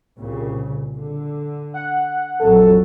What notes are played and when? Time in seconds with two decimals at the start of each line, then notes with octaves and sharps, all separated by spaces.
0.18 C2 A#2 C#3
0.96 D3
1.74 F#5
2.40 A#1 F2 F#3 A4